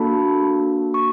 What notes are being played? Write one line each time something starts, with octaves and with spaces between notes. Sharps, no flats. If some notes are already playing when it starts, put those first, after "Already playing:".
Already playing: A#3 D4 F#4 A4 A5 B5
C#6